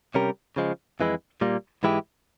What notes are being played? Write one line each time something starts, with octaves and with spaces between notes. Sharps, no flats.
C3 G3 C#4 G4 A#4
C#3 F3 G#3
F2 E3 G#3 E4
A#2 G3 A#3
G#2 E3 G#3 E4 G4